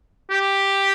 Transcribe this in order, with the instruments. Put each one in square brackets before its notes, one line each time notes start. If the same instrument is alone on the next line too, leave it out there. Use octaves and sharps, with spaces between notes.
[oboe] G4